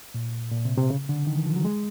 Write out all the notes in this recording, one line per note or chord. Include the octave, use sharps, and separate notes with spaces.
A#2
A#2
C3
C3
C#3
D3
D#3
E3
F3
F#3
G#3